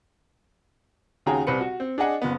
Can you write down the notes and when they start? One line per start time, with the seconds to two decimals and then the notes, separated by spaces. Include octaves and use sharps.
1.26 D#2 C#3 F#4 G#4 G5 A#5
1.47 C2 C4 B4 C#7
1.61 F#4
1.80 C4
1.98 D4 G#4 D#5 F#5 G#5
2.22 F#1 B3